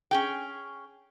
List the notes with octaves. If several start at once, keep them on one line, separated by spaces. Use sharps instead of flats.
C#4 G#4 G5